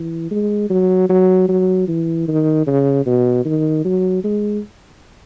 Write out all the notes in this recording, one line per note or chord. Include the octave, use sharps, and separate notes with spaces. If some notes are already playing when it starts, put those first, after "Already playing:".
Already playing: E3
G#3
F#3
F#3
F#3
E3
D#3
C#3
B2
D#3
F#3
G#3